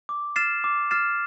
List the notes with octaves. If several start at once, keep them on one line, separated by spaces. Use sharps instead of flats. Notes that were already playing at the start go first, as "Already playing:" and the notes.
D6
F6 A6 C7 E7
D6
F6 A6 C7 E7